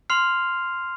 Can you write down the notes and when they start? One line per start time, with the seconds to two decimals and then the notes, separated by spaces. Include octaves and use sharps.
0.10 C6 F6 C7 F7